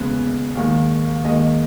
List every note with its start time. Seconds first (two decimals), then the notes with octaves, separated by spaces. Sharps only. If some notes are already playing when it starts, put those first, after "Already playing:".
Already playing: E2 C#3 G#3 B3
0.55 D#2 D#3 G#3
1.24 D#2 D#3 G#3 D#5